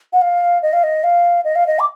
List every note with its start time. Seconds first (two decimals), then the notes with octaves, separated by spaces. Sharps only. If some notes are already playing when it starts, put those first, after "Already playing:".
0.13 F#5
0.22 F5
0.63 D#5
0.73 F5
0.83 D#5
1.04 F5
1.44 D#5
1.56 F5
1.67 D#5
1.79 D6